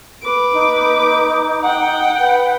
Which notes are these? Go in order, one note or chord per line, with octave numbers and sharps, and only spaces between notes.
B4 D6
D#4
F#5 G5
B4